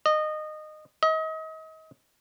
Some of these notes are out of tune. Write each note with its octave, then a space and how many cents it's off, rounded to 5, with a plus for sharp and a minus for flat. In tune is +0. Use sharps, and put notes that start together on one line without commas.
D#5 -20
D#5 +35